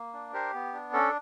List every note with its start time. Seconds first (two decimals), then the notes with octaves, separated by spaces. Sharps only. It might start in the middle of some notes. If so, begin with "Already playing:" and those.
Already playing: A#3
0.13 D4
0.33 G4 A#4 C5
0.54 B3
0.73 D4
0.93 C#4 A4